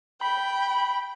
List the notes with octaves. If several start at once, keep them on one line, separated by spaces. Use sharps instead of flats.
G5 B5